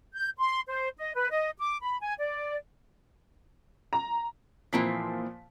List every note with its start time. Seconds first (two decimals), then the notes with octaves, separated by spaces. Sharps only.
0.13 G6
0.38 C6
0.69 C5
0.99 D#5
1.15 B4
1.32 D#5
1.59 D6
1.83 B5
2.01 G#5
2.19 D5
3.93 A#5
4.73 A#2 E3 F3 A#3 C4 B6